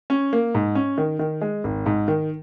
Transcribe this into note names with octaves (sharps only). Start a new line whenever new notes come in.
C#4
A#3
G#2
C#4
D#3
D#3
G#3
G#1
G#2
D#3